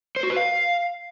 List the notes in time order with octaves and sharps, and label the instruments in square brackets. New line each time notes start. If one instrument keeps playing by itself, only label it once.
[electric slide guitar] C5
F#4
B4
F5